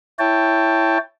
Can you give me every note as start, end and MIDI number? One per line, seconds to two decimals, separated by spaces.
0.19 0.98 64
0.19 0.98 73
0.19 0.98 79
0.19 0.98 81